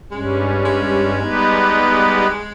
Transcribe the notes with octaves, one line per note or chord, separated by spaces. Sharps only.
G2 G3 G#3 C#4
G#3
G3 B3 D#4 G4 B4